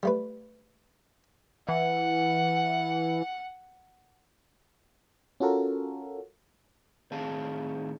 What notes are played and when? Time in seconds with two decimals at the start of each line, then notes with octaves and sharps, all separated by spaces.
0.03 G3 A3 B4
1.69 E3 F#5
5.40 C#4 F4 F#4 A4 A#4
7.12 A2 D#3 C4 G#4 F5 A5